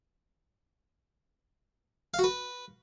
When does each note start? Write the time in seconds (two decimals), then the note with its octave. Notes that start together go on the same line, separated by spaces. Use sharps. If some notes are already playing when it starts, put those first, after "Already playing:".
2.14 F5
2.19 F#4
2.24 B4